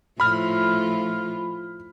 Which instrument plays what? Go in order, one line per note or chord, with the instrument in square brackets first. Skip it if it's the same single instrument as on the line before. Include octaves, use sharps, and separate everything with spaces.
[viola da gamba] A2 F3 F4 [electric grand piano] B5 F6